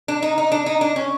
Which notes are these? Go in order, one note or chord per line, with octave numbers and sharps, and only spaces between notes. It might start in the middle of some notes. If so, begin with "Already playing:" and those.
D4
D#4
D#4
D4
D#4
D4
C#4